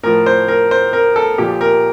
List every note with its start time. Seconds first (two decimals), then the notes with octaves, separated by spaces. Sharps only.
0.03 A2 F3 A#4
0.26 C5
0.48 A#4
0.71 C5
0.93 A#4
1.16 A4
1.38 A#2 F3 G4
1.61 A#4